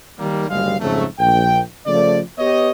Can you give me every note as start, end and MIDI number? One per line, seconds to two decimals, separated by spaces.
0.18 0.49 51
0.18 0.49 55
0.18 0.49 58
0.49 0.76 30
0.49 0.76 38
0.49 0.76 55
0.49 0.76 56
0.49 0.76 77
0.81 1.05 41
0.81 1.05 44
0.81 1.05 49
0.81 1.05 54
0.81 1.05 57
1.19 1.60 34
1.19 1.60 79
1.87 2.19 49
1.87 2.19 53
1.87 2.19 57
1.87 2.19 74
2.39 2.71 59
2.39 2.71 67
2.39 2.71 71
2.39 2.71 73
2.39 2.71 75